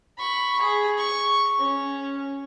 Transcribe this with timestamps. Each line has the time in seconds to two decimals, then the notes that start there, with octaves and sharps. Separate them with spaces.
0.18 B5 C#6
0.61 G#4
0.98 C#6
1.59 C#4